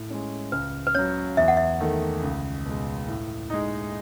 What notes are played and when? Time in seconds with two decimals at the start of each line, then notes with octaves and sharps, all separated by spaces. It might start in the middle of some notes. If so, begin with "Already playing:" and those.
Already playing: A2
0.10 G#3 C#4
0.52 C#2 B4
0.87 B4
0.95 C#3 F#3 C#5
1.37 E2 E5
1.48 F#5
1.57 E5
1.80 D#3 A3
2.23 C#2
2.65 B2 G#3
3.08 A2
3.50 G#3 D#4